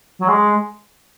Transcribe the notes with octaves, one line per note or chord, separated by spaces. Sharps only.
F#3
G#3